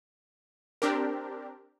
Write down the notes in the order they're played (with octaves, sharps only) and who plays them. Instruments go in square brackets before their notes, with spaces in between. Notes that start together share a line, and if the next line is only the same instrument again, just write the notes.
[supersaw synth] C4 D4 G4 A#4